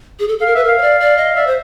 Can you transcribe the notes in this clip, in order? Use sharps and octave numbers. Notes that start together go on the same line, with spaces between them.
G#4
A4
A4 F5
A#4
B4 E5
A#4 F5
C#5
D5
D5
D#5
D5 E5
C5